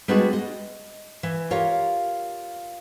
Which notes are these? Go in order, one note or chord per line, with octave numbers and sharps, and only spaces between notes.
G3 G#3 B3 D4 F#4 G#4
D#5
E3
F4 G4 A#4 C#5 F5